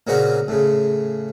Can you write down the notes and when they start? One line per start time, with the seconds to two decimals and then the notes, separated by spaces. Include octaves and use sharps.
0.07 A#2 C#3 A#3 C4 C#4 F#4
0.48 A2 C#3